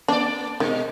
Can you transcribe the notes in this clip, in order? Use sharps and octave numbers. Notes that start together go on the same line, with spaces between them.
A#3 D4 D5
B2 D#3 G#3